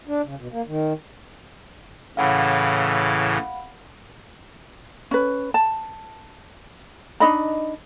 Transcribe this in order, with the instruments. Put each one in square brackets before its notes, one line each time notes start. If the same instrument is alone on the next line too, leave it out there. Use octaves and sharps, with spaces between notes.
[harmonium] D4
C#3
B2
A#3
D#3
[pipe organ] A2 C#3 E3 [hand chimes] F5 F#5 B5
[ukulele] C#4 B4
A5
D4 D#4 D#5 B5